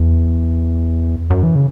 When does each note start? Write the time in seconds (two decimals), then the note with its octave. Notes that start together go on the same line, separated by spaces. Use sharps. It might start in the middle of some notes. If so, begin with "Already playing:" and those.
Already playing: E2
1.30 F#2
1.43 E3
1.55 C#3